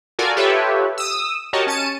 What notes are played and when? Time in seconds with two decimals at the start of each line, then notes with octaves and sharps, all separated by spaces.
0.19 F4 F#4 A4 A#4 D5 G#5
0.36 F4 G4 A4 B4 C#5 E5
0.98 D#6 E6
1.53 F#4 G4 A#4 C#5 D#5 A5
1.67 C#4 A5 C#7 D#7